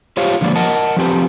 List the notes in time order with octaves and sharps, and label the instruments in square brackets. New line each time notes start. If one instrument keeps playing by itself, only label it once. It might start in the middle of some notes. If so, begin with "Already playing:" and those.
[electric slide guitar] F4 G4 C5 C#5 F5
D3 F3 G#3 A#3 D5
A#4 D#5 F#5 A5
F3 C4 G4 B4